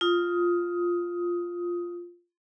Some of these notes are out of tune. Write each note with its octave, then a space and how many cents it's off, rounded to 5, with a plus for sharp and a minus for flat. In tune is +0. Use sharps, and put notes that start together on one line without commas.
F4 +0 D#6 +15